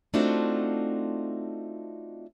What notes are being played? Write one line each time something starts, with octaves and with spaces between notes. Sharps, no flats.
A3 C4 D4 D#4 F4 F#4